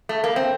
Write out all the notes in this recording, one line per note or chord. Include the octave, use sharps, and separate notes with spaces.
A3
A#3
C4